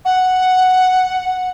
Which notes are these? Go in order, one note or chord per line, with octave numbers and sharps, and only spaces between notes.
F#5